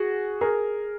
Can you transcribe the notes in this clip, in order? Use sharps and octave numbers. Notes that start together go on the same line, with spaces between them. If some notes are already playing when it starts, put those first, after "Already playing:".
Already playing: F#4 G#4
G#4 A#4